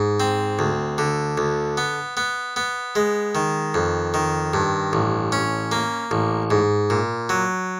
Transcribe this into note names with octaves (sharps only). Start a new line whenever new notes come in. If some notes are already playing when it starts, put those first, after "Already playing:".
Already playing: G#2
C4
D2
D3
D2
B3
B3
B3
G#3
D#3
F2
D#3
G2
A1
C#4
A#3
A1
G#2
A#2
F#3